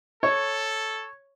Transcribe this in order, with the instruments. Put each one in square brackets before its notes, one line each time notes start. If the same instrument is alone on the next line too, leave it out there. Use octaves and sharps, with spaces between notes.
[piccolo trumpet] A4 [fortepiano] C#5